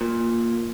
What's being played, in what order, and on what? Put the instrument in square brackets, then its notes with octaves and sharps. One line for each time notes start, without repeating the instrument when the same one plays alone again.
[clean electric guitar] A#2